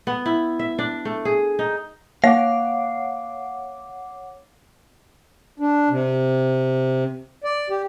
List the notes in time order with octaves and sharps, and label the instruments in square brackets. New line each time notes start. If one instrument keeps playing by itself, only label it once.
[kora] B3
E4
E5
D4
A3
G#4
D#4
[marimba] A#3 [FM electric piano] C#5 F#5 D6 [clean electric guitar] F5
[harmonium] D4
C3
D5
G4